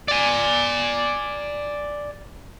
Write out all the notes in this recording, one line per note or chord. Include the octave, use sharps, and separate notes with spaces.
D5 G#5